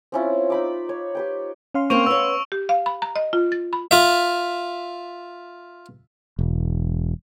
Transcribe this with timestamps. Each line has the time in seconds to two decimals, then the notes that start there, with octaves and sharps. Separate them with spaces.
0.12 C4 C#4 E4 F4
0.50 D#4 B5 D6
0.89 C#5
1.15 G4 B4 G5
1.74 C#4 F5 C6
1.90 A#3 C4 C5 C#6 D7 F7
2.06 B3 C#5 E6
2.52 G4
2.69 F5
2.86 B5
3.02 A#5
3.16 D#5
3.33 F4
3.52 A6
3.73 B5
3.91 F4 E5
6.39 E1